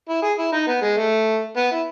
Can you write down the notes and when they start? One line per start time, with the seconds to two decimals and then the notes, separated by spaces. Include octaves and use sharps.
0.09 E4
0.23 G#4
0.38 E4
0.52 D#4
0.67 B3
0.82 G#3
0.97 A3
1.57 B3
1.72 E4